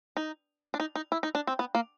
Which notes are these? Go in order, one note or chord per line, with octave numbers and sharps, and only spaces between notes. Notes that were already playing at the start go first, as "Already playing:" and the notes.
D#4
D4
D#4
D#4
E4
D#4
D4
C4
B3
A#3